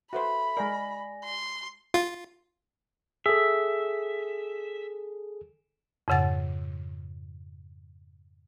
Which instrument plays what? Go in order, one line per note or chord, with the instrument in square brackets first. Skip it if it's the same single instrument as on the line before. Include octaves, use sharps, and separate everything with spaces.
[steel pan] F#4 B4 C5 [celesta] A4 E5 [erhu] B5
[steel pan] G#3 A#4 [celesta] D5 G#5 A#6
[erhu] C6
[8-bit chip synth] F4
[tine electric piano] G#4 A4 [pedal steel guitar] E5
[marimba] F2 G#2 C#3 F#5 A6